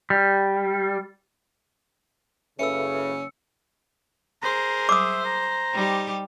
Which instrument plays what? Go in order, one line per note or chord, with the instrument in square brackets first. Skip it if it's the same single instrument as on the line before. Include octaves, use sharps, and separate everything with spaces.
[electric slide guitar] G3
[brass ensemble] F#1 C#3 [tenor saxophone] C#4 [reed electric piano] A4 B4 E5 [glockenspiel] E6 C#7
[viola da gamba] G#4 A#4 [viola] C5 [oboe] A#5
[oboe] E5 [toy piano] D6 D#6
[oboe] A#5
[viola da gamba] G3 D#4 G4